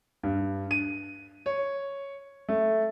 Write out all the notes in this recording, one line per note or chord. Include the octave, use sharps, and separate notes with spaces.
G2
D#7
C#5
A3